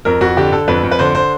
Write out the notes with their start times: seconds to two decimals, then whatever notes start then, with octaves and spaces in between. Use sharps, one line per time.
0.05 F2 A#4
0.21 F2 F#4
0.37 D3 G4
0.52 D3 A4
0.68 F2 B4
0.84 F2
0.91 B4
0.99 D3 C5
1.15 D3 C5